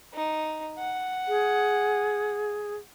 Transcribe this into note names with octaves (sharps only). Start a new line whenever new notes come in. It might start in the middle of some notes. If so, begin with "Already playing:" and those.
D#4
F#5
G#4